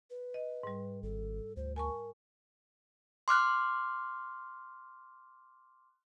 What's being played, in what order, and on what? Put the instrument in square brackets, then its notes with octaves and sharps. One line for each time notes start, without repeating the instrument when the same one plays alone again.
[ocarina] B4
[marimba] D#5
G#2 G3
[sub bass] G#1 [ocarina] A4
[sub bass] D2 [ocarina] C5
[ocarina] A#4 [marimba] G#5 A5 C#6
[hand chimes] C6 D6 F6 F#6